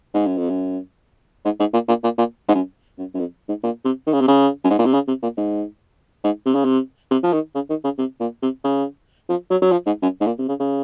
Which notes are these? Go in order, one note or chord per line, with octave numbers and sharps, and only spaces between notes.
G#2
F#2
F2
F#2
G#2
G#2
A#2
A#2
A#2
A#2
G#2
F#2
F#2
F#2
F2
G#2
A#2
C3
D#3
C#3
C3
C#3
F#2
G#2
A#2
C3
C#3
C3
A#2
G#2
G#2
C3
C#3
C3
C3
F3
D#3
C#3
D#3
C#3
C3
A#2
C3
C#3
F3
F#3
F#3
F3
G#2
F#2
G#2
A#2
C3
C#3
C#3